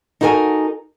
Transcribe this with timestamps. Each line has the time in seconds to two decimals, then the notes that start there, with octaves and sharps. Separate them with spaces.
0.21 D#4 E4 F#4 A4 A#4 G#5